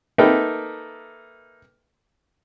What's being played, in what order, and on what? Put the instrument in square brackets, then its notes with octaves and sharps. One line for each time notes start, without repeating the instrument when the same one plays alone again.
[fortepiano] A#3 D#4 A4 B4 E5 G5